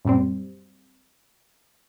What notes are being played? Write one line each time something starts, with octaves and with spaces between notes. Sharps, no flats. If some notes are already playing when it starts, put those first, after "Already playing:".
F#2 A#2 G3 C4